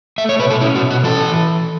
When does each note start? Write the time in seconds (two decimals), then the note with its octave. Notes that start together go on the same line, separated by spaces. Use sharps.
0.18 A3 E5
0.29 C#5
0.39 B2 B4
0.50 A4
0.61 C#4 E4
0.76 F#4
0.82 B2
0.90 F#4
1.04 E3 A4